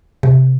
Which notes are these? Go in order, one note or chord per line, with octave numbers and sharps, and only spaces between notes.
C3